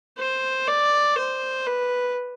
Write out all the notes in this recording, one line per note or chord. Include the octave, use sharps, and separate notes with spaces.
C5
D5
C5
B4